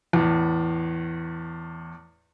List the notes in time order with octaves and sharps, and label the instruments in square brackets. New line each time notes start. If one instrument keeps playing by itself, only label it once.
[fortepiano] E2 A2